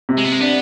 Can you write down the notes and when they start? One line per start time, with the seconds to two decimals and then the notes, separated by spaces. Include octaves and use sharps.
0.09 C3
0.17 G#3
0.25 B3
0.32 G#3
0.40 B3 D4